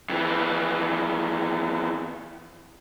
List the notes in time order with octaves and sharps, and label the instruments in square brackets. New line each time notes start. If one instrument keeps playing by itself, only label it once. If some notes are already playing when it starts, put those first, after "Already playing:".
[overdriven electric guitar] F2 E3